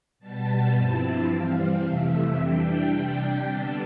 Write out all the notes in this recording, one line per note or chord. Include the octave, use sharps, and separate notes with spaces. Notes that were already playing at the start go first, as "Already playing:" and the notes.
B2 G3 B3 A5
G2 F3 C4 E4 A5
E3 G3 C4 F5
F2 C3 E3 A3 E5
E3 G3 D4 G5
C3 G3 D4
D3 G3 B3 A5